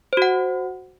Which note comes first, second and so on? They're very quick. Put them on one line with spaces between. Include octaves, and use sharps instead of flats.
C5 F#4 F#5